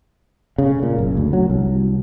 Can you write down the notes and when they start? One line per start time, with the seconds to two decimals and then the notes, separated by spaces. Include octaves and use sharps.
0.58 C#3
0.83 A#2
0.99 F#1
1.17 D2
1.33 F#3
1.50 C2